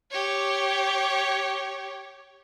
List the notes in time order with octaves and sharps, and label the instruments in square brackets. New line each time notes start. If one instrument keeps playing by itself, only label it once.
[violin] G4 C#5